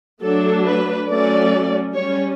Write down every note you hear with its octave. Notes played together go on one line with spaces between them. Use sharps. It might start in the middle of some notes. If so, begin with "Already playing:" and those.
F#3 A3 D4 A4
B4
F#3 A3 C#4 D5
G3 C#4 C#5